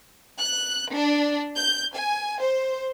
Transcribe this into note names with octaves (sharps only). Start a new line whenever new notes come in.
F#6
D4
G6
G#5
C5